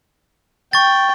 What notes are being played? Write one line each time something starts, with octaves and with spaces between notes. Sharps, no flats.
G5 C#6 A6